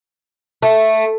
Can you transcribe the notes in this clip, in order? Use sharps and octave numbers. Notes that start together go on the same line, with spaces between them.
A3